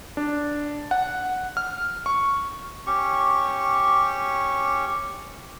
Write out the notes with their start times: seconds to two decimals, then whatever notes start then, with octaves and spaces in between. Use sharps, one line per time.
0.17 D4
0.91 F#5
1.57 F6
2.06 C#6
2.87 C#4 G4 C#6